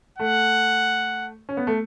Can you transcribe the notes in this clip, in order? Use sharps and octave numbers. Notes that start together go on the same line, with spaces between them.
A3 F#5
C#4
B3
A3